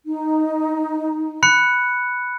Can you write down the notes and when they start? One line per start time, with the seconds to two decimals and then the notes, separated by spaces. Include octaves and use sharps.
0.06 D#4
1.43 B5 F#6 C#7